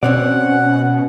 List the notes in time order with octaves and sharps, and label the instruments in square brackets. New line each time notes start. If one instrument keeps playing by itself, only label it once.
[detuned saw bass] B2 [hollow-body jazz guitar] C4 C#5 D5 [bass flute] C#4 [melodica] F#5